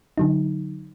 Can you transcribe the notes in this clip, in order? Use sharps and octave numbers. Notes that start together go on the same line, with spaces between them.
D3 F#3 D#4